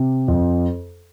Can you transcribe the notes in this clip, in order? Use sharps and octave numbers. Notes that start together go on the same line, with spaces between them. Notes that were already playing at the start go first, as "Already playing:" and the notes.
Already playing: C3
F2